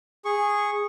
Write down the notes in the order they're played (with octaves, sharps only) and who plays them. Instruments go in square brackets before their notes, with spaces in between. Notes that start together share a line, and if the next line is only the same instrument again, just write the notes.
[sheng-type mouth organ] G#4 C#6